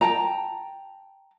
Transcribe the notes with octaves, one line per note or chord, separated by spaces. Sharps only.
G5 A5 A#5